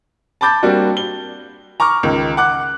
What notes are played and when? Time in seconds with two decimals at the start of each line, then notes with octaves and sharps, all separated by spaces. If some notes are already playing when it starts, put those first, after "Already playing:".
0.41 A5 B5 D6 G6 A6
0.63 G3 A#3 C4 D4 F#4
0.97 G7
1.80 A#5 C#6 D6 F6
2.03 C#2 D#3
2.37 F#5 D6 F#6